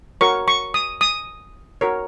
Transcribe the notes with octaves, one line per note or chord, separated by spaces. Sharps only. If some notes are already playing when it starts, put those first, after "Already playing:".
F#4 A#4 C#5 C#6
C#6
D#6
D#6
F#4 A#4 C#5